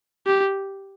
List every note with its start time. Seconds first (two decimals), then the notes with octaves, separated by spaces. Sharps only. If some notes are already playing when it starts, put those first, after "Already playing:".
0.27 G4